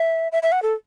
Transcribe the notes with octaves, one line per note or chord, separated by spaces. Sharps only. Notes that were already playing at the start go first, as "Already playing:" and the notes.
Already playing: E5
E5
E5
F#5
A4